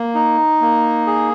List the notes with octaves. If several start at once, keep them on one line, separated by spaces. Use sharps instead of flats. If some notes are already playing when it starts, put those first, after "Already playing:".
Already playing: A#3
D#4
A#3
G#4